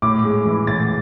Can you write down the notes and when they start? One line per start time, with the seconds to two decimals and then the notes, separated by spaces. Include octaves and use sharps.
0.02 A2 D6
0.24 G#3
0.46 E3
0.67 A2 A6